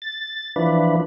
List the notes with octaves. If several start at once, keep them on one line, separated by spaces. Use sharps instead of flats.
A6
E3 F3 D4 B4